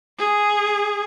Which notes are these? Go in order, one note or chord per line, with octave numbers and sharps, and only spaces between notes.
G#4